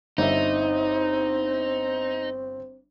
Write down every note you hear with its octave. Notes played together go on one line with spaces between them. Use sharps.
G1 C4 D#4 E5